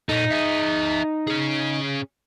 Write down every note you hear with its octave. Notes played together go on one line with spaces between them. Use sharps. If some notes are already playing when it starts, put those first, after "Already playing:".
A#2 D#4 A4
G#4 E5
C#4 G#4